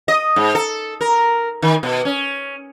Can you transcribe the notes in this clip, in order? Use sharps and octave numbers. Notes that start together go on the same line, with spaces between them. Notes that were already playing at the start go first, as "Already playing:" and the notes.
D#5
G#2
A4
A#4
D#3
B2
C#4